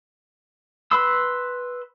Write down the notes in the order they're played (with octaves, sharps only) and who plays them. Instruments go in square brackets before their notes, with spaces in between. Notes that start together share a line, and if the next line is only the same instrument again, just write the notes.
[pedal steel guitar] B4 B5 C6 E6